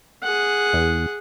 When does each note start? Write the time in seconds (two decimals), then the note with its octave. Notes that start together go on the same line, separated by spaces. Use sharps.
0.24 G#4 F#5
0.73 E2